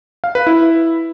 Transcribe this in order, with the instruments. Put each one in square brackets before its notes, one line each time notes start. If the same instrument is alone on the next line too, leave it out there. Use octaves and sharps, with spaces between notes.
[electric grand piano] F5
B4
E4